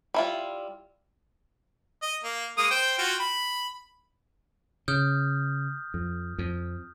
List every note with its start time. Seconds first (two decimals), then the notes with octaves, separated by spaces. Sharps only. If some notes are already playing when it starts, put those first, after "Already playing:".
0.14 G3 E4 F4
2.02 D#5
2.24 A#3
2.58 G#3 A#3 D#6
2.71 C5 G5
2.99 F4 F#4 G5
3.20 B5
4.88 C#3 D#6 F6 G6
5.94 F2
6.38 F2